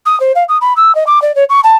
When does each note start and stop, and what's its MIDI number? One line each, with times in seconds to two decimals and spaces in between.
0.06 0.18 87
0.20 0.32 72
0.35 0.44 77
0.48 0.57 87
0.61 0.73 83
0.76 0.95 88
0.95 1.04 75
1.07 1.22 86
1.22 1.34 74
1.35 1.44 73
1.49 1.60 85
1.64 1.76 81